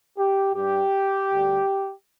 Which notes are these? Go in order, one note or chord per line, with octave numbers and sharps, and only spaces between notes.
G4
G2 G3 G4
D2 D3 G3